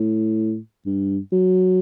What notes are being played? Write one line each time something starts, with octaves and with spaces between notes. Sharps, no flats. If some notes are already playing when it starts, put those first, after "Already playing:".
Already playing: A2
G2
F#3